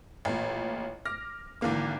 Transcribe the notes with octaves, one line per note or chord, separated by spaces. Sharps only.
A1 A#2
D6 F6 A#6
G#1 D3 E3 A#3 D6